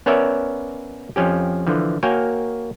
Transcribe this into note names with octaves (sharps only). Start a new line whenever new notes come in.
B3 C#4 A#4 C#5 D5 E5
F2 F3 C#4 G4
D3 E3 F3
A#3 F#4 A#4 C#5 G5 G#5